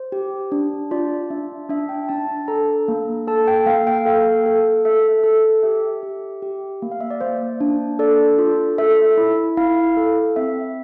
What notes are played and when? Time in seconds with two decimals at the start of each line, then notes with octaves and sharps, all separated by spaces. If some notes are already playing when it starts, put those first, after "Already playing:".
Already playing: C5
0.12 G4
0.52 D4
0.91 F4 D5
1.30 D4 E5
1.70 D4 E5
1.89 G5
2.09 D4 A5
2.29 A5
2.48 A4 A#5
2.88 A#3
3.27 A4 A5
3.48 G5
3.66 A#3 F5
3.87 G5
4.05 A4 F5
4.46 A4
4.85 A4 E5
5.24 A4
5.63 G4 E5
6.03 G4
6.42 G4
6.82 A#3
6.92 F5
7.01 E5
7.10 D5
7.21 A#3 C5
7.61 D4
7.99 A4 D5
8.39 F4
8.78 A4 E5
9.17 E4
9.57 E4 F5
9.97 A4
10.36 C4 E5